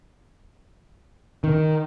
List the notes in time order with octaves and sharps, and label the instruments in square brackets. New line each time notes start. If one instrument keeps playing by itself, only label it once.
[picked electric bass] D#3